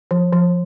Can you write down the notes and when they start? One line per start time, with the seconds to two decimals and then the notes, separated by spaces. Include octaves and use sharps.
0.11 F3
0.33 F3